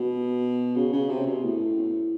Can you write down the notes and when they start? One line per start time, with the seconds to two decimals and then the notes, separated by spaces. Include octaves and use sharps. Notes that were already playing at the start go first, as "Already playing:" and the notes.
Already playing: B2
0.76 C#3
0.93 C#3
1.09 C3
1.27 B2
1.43 A2